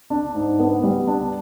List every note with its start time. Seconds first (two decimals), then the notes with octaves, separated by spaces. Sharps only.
0.10 D4
0.35 G#2
0.59 B3
0.84 G3
1.08 D4